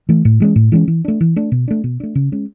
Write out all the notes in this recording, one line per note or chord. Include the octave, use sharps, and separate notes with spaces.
E3 A3
A2
E3 G#3 C#4
A2
E3 G#3 C#4
E3
A3 D4
E3
A3 D4
B2
A3 D4
B2
A3 D4
C#3
G#3 C#4